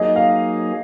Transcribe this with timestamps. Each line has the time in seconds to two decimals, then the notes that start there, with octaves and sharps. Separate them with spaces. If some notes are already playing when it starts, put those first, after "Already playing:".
Already playing: F#3 A#3 D#4 G#4 D#5
0.16 F5